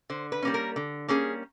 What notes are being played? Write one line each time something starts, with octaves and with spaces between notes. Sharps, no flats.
D3 C5
B4
G3 A#3 C#4
A#4
D3
G3 A#3 C#4 G#4